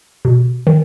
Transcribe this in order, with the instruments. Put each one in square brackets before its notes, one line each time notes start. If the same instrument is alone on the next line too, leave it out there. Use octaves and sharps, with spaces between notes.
[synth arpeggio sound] B2
D#3